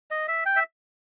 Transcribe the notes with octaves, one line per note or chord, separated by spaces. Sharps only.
D#5
E5
G5
E5